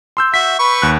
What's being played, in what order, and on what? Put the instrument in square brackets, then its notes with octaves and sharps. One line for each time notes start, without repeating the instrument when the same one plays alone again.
[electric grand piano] C6 E6 G6
[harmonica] F#4 E5 [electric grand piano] B6
[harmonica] B4 C#6
[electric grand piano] D#2 F#6